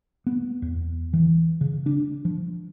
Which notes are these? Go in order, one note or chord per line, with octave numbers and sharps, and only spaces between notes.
B3
E2
E3
C#3
D4
F3